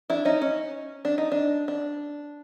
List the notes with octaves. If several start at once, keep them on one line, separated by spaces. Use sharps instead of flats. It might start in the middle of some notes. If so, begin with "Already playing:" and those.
D4 E4
C#4 D#4
C#4
D4
D#4
D4
D4